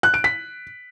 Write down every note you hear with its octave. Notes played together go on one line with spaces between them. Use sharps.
F#6
D7
B6